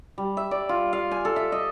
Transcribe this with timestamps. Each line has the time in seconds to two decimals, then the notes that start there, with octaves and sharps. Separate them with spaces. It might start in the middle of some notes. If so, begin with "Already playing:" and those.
0.18 G3
0.37 E5
0.51 D5
0.69 F4
0.93 F5
1.11 G#5
1.25 A4
1.36 E5
1.52 D#5